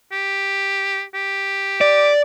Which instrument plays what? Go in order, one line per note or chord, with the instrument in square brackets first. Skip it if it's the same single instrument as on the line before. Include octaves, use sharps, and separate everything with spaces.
[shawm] G4
G4
[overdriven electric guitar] D5